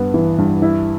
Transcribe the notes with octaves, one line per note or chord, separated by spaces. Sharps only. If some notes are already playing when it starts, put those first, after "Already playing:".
Already playing: G2 B3
E3
G2
E4